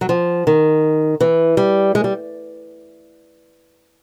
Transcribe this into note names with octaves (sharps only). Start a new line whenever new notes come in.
F#3
F3
D#3
E3
G3
G#3
G3